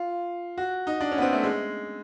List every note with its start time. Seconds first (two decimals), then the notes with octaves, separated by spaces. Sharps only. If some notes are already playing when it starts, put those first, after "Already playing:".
Already playing: F4
0.58 F#4
0.87 D#4
1.01 D4
1.12 C#4
1.18 B3
1.22 C4
1.33 A3
1.43 G#3